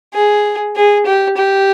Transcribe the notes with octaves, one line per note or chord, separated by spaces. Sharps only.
G#4
G#4
G4
G4